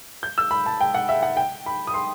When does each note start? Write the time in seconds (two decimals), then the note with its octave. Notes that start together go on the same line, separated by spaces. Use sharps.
0.23 G6
0.38 E6
0.51 B5
0.66 A5
0.81 G5
0.94 F#5
1.09 E5
1.23 F#5
1.37 G5
1.66 B5
1.87 D#6
1.94 C6